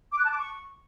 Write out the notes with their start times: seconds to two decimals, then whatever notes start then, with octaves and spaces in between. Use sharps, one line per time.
0.12 D6
0.18 F#6
0.25 A5
0.31 D6
0.38 C#6